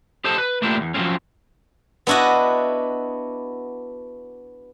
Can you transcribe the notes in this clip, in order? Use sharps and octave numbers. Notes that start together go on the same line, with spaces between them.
G4 A4 C5 D#5 A5
B4
A3 A#3 D4 E4 F4 G4
E2
F3 F#3 G#3 A3 C4 C#4
B3 D4 E4 F#4 D#5